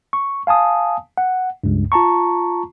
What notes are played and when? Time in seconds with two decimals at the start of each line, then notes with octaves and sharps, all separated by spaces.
0.13 C#6
0.47 F5 G#5 A5 D#6
1.18 F#5
1.64 C#2 G2
1.92 F4 A5 A#5 C#6